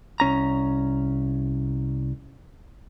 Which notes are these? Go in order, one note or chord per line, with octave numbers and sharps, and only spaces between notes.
C2 C#4 A#5